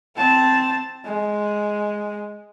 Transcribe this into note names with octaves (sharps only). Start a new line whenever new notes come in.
C4 A5
G#3